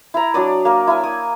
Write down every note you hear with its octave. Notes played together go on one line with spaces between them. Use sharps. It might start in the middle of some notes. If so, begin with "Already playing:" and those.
E4 A#5
F#3 D4 D5 D#6
A#3 A#4
E4 G#5
D#6